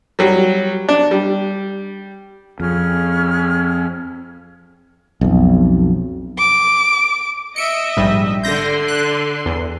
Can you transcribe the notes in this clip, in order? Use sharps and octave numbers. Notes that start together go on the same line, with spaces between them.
F#3 G3
D4
G3
F2 C#4 G#4 F6
B1 F2
D6
D#5 E5 C#7 D7
A#1 G#2 G3
D3 C6 G6 A#6
F#6
E2